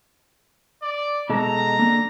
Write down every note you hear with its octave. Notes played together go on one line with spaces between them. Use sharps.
D5
B2 G#3 A4 A#5
D3 A#3